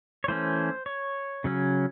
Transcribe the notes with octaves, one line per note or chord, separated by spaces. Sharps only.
C#5
E3 A3 C#4 C5
C#5
C#3 F#3 C#4